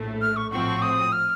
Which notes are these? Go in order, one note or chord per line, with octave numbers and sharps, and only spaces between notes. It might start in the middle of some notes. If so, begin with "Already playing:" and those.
Already playing: A#1 A2 A3
F6
C#6
A2 F3 C4 F#4 C#6
D#6
F6